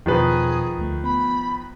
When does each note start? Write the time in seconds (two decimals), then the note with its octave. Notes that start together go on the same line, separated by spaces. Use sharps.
0.06 E2 B2 D#3 F3 G#4 B4
0.78 D2 A3
1.04 B3 B5